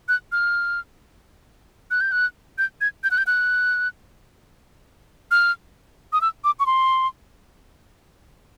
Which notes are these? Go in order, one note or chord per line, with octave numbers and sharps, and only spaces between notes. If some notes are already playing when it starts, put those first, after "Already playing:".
F#6
F6
F#6
G6
F#6
G6
G#6
G6
F#6
G6
F#6
F6
D#6
E6
D6
C#6
C6